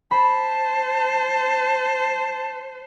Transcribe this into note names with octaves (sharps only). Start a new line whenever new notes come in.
C5 A5 B5